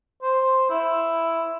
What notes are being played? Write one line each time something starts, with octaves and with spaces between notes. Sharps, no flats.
C5
E4